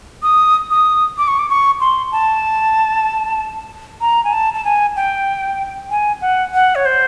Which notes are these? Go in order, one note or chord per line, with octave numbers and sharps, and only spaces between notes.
D#6
D#6
D6
C#6
D6
C#6
C6
A5
A#5
G#5
A5
A5
G#5
G5
G#5
F#5
F#5
C#5
C5